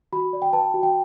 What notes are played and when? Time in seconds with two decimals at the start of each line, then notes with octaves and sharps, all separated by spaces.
0.13 F#4 B5
0.33 D5
0.42 G5
0.53 B4 A5
0.74 F#4
0.83 G5